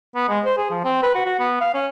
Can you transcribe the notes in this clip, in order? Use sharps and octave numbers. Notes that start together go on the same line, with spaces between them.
B3
G#3
C5
G#4
F3
C4
B4
F#4
F#4
B3
F5
C#4